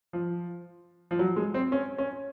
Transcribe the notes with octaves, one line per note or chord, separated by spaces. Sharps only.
F3
F3
F#3
G#3
C4
C#4
C#4